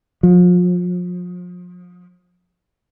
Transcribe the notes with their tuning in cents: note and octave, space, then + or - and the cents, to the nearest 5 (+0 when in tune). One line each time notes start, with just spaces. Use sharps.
F3 +35